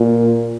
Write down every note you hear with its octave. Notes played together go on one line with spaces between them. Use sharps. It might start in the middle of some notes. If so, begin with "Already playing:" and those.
Already playing: A#2